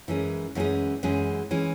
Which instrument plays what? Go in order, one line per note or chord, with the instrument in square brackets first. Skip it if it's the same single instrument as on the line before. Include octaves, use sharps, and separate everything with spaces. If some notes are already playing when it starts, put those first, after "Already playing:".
[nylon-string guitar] F#2 E3 G#3 C#4 G#4
F#2 E3 G#3 C#4 G#4
F#2 E3 G#3 C#4 G#4
E3 G#3 C#4 G#4